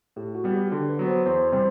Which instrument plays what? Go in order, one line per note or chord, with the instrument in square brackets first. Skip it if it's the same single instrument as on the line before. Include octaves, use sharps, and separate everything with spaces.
[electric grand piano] A2 [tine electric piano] G4
[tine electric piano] F#4
[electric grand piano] G3 B3
[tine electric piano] G4
F#4
[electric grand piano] D3 [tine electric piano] G4
[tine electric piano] B4
[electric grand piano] F#3 B3
[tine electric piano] C5
[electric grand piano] E2 [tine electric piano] C5
[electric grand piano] C3 G3 [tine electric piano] C5